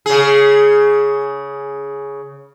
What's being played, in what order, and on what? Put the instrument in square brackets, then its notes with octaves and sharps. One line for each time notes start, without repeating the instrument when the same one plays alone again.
[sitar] C#3 G#4